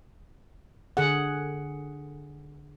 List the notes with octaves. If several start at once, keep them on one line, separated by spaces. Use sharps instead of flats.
D3 G#4 F#5